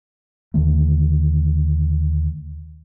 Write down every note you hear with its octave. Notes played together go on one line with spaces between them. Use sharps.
D#2 D3 D#3 A3